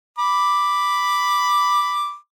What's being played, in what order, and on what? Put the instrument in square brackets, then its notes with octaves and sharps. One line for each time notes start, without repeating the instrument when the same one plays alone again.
[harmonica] B5 D6